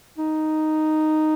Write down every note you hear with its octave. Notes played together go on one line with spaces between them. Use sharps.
D#4